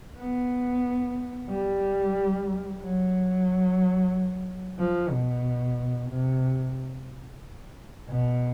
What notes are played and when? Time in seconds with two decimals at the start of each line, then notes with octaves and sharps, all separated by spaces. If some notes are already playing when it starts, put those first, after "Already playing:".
0.18 B3
1.49 G3
2.82 F#3
4.79 F3
5.11 B2
6.10 C3
8.08 B2